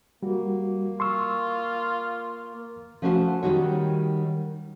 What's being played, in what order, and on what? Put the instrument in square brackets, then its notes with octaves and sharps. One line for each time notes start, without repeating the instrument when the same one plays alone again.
[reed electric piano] G3 F#4 [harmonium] A#3
[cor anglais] F4 [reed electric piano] C6 C#6 E6
[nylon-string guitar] F3 A3 C#4 F#4 A#4 C5
D#3 G3 D#4 F#4 C#5